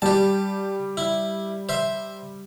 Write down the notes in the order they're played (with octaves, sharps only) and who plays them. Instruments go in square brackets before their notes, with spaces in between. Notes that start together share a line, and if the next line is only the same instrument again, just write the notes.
[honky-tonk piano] G3 [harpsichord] G4 A5
[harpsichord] E4
C5 E5